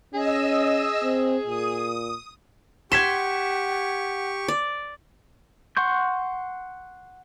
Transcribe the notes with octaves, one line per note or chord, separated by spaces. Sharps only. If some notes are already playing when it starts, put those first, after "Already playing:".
C#4 G#4 D#5 E6
C4
A#2 D#6
G4 F#5 C6 C#6 G#6 B6 E7
D5
F#5 C6 C#6 G6